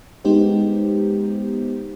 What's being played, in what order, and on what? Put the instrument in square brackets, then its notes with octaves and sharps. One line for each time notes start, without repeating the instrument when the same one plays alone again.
[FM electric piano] G#3 B3 D#4 G4 C5